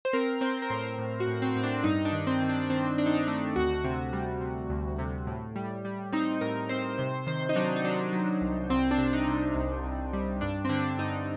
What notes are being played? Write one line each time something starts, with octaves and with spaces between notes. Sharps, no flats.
C5
C4 A#4
C4 C5
A#4
A2 C5
A2
F#4
A2
C4
A2 C4
D4
G2 D#4
D4
D#3
C4
D#3
D4
D#3 C4
C4 D4
D#4
D4
A3 D4
D2 F#4
C3
G3
C3
D2
C3
A2
G3
G3
C4 D#4
A2 A#4
C4 C5
C3 C5
D#3 C5
D#4
F#3 D4
D#4
F#3 D4
F#3
C2
C2 C4
D4
C3
D#4
C3
C2
C2
G3
G2 D4
C4
D3 D4
G2 D#4